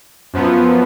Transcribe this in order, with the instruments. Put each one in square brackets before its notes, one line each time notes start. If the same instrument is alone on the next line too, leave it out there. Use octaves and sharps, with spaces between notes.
[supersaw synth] F#2 F3 B3